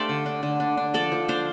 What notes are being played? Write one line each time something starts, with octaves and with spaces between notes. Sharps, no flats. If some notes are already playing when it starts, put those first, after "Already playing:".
Already playing: A3 D4 G4 A4 C5 D5 F5
D3
D4
D3
D4
D4
F3 A4 D5
F3
D4 C5 F5